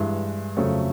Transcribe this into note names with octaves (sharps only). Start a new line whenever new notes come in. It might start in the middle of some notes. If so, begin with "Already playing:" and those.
Already playing: G2 E3 G#3 E5
F2 C#3 F#3 A3 C4